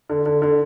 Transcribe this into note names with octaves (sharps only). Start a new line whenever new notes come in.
D3
D3
D3